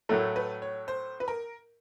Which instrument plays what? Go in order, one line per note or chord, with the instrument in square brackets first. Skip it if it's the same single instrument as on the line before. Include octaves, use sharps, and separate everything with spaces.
[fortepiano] A2 F#3 A3 [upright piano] A#4
[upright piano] B4
C#5
C5
B4
A#4